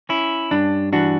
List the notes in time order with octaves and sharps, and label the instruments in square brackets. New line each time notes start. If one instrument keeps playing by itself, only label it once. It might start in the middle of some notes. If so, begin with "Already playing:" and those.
[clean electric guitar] C#4 E4
G2 D4
E3 D4 F#4